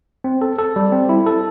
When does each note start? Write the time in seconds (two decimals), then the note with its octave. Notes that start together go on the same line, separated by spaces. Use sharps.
0.24 C4
0.41 A4
0.58 A4
0.76 G3
0.92 C4
1.09 E4
1.26 A4